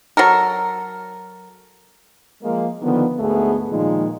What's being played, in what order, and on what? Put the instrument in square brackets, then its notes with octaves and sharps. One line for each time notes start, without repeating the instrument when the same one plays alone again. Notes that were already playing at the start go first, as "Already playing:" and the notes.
[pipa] F#3 A4 A#4
[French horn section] F3 G#3 A#3
D3 D#3 F3 B3
D2 G#2 A3 B3 G#4
A#2 D#3 F3 G#3 D#4